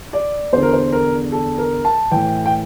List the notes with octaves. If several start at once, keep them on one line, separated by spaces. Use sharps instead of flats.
D5
E2 D3 C5
A#4
C5
A#4
A4
A#4
A5
A2 E3 G5
G5